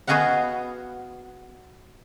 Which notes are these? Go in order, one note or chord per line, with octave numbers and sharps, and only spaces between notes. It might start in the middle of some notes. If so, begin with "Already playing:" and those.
B3 F#4 G#4 D#5 F5 F#5